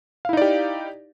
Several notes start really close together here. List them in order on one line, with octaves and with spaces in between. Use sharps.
F5 E4 D#4 D5 G4